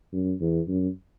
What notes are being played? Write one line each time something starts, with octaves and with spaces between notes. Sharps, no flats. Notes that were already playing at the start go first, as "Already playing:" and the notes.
F#2
E2
F#2